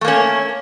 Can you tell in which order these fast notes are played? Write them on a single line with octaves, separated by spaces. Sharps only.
A3 A#3 C#4